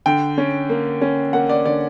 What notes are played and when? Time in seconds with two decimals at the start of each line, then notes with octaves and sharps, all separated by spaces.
0.06 D3 G5
0.38 C#4
0.69 A#3
1.01 C#4
1.33 A#3 F#5
1.49 D5
1.66 D3 D5